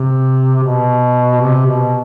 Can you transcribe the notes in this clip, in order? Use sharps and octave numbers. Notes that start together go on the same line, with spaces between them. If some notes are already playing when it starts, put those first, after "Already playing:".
Already playing: C3
B2
C3
B2